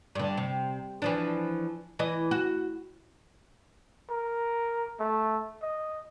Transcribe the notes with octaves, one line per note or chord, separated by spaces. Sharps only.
G2 D3
C3
E3 F3 D4
E3 D#5
F#4
A#4
A3
D#5